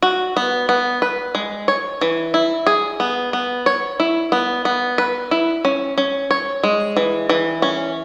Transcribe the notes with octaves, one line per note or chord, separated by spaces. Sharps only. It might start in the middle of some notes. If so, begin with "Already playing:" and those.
F#4
B3
B3
B4
G#3
C#5
E3
E4
G#4
B3
B3
C#5
E4
B3
B3
B4
E4
C#4
C#4
C#5
G#3
E3
E3
C#4